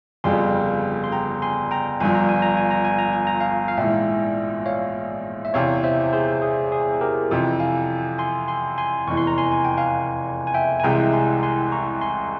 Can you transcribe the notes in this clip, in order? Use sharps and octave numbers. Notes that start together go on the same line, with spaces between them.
G1 F2 C#3 G3 G#5 C6
C6
G5 A#5
G#5 C6
G5 A#5
G1 G2 F3 G#5
A#5
G#5
A#5
G#5
A#5
G#5
A#5
G#5
A#5
F5 G#5
F5
A#1 G#2 E3 E5 G5
C#5 F5
E5
E2 C3 E3 C#5 F5
C5 E5
G#4 C5
G#4
G#4
G4 A#4
F2 C3 E3
F5 G#5
G#5 C6
G#5 C6
G#5 C6
F1 E2 E3 C#6
C6
A#5
G#5 C6
G#5
G5
F5 G#5
G#5
E5 G5
G#5
C2 C3 E3 G#3 E4 G5 A#5
G#5 C6
G#5 C6
A#5 C#6
G#5 C6